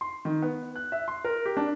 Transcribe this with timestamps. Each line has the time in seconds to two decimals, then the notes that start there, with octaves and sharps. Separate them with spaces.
0.01 C6
0.25 D#3
0.42 B3
0.76 F#6
0.92 E5
1.08 C6
1.25 A#4
1.45 G4
1.57 D4